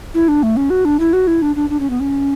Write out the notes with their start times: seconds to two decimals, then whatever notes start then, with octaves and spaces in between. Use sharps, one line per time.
0.14 E4
0.28 D4
0.43 A3
0.57 C#4
0.70 F#4
0.85 D4
1.00 E4
1.13 F#4
1.27 E4
1.42 D4
1.56 D4
1.70 D4
1.80 C#4
1.90 B3
2.00 C#4